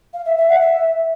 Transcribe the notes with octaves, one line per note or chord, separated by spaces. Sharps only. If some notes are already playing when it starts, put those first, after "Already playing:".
F5
E5
E5
F#5
E5